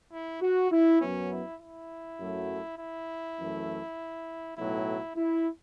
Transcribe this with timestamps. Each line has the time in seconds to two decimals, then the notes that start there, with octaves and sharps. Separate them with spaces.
0.11 E4
0.42 F#4
0.71 E4
1.01 F#2 F#3 B3 C#4
1.31 E4
1.60 E4
2.19 F#2 F#3 A3
2.79 E4
3.39 F#2 E3 A3
4.57 B1 A2 F#3 E4
5.17 E4